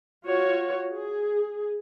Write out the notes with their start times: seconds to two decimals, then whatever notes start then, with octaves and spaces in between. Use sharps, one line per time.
0.24 F4 F#4 C#5
0.93 G#4